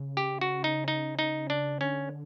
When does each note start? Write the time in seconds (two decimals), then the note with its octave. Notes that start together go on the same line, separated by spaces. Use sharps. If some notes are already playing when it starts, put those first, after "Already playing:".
Already playing: C#3
0.17 G4
0.41 F#4
0.64 D#4
0.88 D#4
1.19 D#4
1.50 D4
1.81 D3 C#4